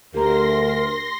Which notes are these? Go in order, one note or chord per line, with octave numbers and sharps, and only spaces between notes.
D2 G4 A#4 A#5 C6 A#6